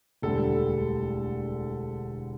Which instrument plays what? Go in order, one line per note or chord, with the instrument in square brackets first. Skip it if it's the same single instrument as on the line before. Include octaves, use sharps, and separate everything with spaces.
[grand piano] E1 D2 D3 G3 A4